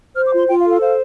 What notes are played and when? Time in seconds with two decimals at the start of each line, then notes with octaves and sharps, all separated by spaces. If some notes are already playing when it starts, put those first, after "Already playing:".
0.15 C5 F6
0.26 D6
0.32 F4 C6
0.48 F4 G5
0.59 F5
0.64 A4
0.70 F5
0.81 C5 F5